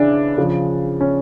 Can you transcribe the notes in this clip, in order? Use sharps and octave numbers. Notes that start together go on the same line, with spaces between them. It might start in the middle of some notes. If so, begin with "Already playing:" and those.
Already playing: C#3 E3 D4
C#3 F3
C#4